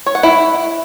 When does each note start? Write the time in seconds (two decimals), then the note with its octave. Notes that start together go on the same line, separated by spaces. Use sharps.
0.06 C#5
0.15 F#5
0.23 E4